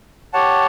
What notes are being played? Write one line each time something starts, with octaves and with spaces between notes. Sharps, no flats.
G4 C#5 F#5 A5